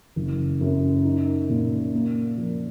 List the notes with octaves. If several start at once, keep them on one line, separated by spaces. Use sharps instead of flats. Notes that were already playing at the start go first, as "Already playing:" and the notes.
F#1
F#2
D#4
A#2
A#3
F3